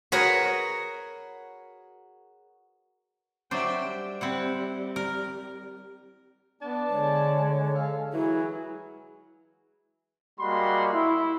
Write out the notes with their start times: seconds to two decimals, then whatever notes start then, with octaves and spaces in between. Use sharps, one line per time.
0.12 F#4 G#4 A#4 B4 C#5
3.51 F#3 D4 C5 E5 G5
3.82 G3
4.21 C4 E4 F#5
4.96 A#4
6.61 B3 D4 A5
6.90 D3 G#3 C#5
7.75 A4 F5
8.13 E3 F#3 E4 G#4
10.40 G3 G#3 A#3 F#4 B5 C6
10.94 E4